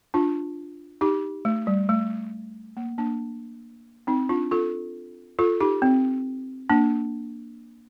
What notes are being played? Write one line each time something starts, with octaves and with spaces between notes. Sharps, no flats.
D4 F4
D#4 G4
A3
G3
A3
A#3
A#3 D4
C4 D#4
D4 F4
F4 A4
F4 A4
D#4 G4
C4
A#3 D4